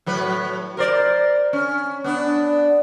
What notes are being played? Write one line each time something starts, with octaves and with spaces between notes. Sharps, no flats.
A2 F#3 B4
A#4 C5 D5
C#4
B3 D4